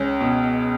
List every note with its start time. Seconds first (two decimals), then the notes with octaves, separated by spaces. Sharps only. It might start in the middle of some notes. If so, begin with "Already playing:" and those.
Already playing: C#2 C#4
0.21 B2